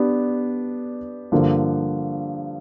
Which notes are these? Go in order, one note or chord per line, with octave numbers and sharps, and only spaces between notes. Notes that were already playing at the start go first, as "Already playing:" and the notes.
Already playing: B3 D4 G4
G2 D3 F3 A#3